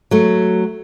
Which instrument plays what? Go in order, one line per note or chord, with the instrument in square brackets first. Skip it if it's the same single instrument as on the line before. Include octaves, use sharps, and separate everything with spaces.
[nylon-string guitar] F#3 A3